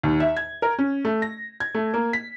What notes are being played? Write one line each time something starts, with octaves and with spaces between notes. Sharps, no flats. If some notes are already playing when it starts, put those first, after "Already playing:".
D#2
E5
G#6
A#4
C#4
A3
A#6
G#6
A3
A#3
B6